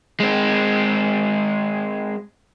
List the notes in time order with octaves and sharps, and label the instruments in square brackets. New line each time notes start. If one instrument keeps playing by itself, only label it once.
[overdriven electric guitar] G#3 C4